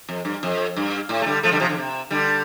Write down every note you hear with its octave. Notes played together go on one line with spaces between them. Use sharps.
F2
G2
F2
G2
A2
A3
D3 G3
F3 A3
D3 G3
C3 F3
D3
C3
D3 G3